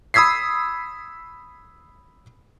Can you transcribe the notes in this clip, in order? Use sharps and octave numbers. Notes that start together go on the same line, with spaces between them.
B5 D#6 E6 G#6 B6 C7